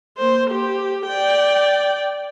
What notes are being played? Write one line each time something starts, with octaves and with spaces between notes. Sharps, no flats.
A#3 C5
G4
D5 G5